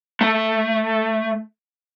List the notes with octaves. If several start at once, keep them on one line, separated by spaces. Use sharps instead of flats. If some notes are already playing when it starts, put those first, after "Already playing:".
A3